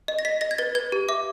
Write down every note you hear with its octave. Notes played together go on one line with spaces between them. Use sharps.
D#5
A#6
D#5 B6
D#5 A#6
G#6
B4 A6
B4 G#6
G4
E5 D6